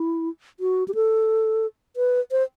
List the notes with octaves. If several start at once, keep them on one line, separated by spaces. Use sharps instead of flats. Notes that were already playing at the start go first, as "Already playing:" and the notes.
Already playing: E4
F#4
G4
A4
B4
C5